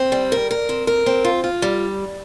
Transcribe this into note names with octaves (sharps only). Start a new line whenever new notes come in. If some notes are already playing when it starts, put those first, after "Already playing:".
Already playing: C4
G3
A#4
A#4
C4
A#4
C4
F4
F4
G3